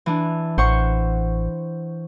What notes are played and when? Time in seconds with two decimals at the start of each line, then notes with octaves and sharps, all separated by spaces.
0.06 E3 D4
0.58 A1 C5 F#5 C#6